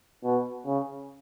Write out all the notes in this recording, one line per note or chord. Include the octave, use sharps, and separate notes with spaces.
B2
C#3